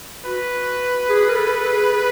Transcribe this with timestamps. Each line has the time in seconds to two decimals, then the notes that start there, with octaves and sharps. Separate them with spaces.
0.25 F#4 B4
1.09 G#4
1.29 A#4
1.36 A4
1.65 G#4
1.92 G#4